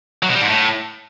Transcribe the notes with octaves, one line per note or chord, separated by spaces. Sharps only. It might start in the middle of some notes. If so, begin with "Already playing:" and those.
F#3
B2
G3
G#2
A2